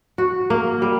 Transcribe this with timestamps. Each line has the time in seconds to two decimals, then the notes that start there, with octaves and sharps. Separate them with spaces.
0.18 F#4
0.50 A#3
0.82 G3